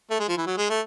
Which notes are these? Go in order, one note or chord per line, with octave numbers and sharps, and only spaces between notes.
A3
G#3
F3
E3
F#3
G#3
A3